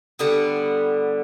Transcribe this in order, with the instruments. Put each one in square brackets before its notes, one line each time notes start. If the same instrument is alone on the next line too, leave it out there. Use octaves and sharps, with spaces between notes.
[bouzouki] D3 G3 B3